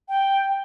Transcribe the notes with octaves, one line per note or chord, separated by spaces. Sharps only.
G5